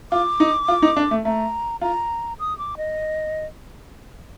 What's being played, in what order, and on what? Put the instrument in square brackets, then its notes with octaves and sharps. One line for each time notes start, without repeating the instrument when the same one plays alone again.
[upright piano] F4 [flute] D6
[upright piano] D#4
F4
D#4
D4
A3
[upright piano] A3 [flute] A#5
[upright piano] F4 [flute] A#5
[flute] D#6
D6
D#5